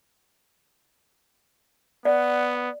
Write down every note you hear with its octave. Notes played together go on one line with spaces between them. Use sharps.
B3 D5 F#5